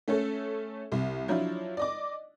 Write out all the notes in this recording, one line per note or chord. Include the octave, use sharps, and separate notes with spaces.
A3 C#4 A4
C2
F3 F#3 D4 E4 F4
D5 D#5 D6